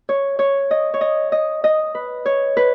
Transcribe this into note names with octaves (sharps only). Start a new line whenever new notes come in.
C#5
C#5
D#5
C#5
D#5
D#5
D#5
B4
C#5
B4